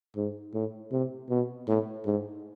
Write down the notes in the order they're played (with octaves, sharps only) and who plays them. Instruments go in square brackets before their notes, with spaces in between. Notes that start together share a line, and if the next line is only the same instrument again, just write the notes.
[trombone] G#2
A2
C3
B2
A2
G#2